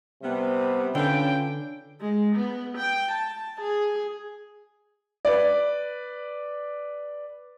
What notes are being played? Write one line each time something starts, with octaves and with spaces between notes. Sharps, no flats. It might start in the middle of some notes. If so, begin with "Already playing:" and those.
C3 G3 B3
D3 C#4 D4 F4 B4 G5
G#3
B3
G5
A5
G#4
B4 D5